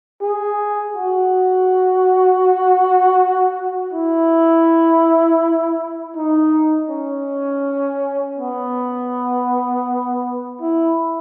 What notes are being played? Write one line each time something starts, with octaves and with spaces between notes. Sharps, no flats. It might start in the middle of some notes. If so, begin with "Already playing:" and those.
G#4
F#4
E4
D#4
C#4
B3
E4